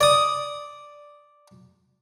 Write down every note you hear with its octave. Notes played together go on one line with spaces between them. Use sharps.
D5 D#6